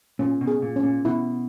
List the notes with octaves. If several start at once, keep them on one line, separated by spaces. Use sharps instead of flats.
A#2 C#4
B2
G#4
A#2
C#4
A#2
B2 E4